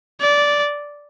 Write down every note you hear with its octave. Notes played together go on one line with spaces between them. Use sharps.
D5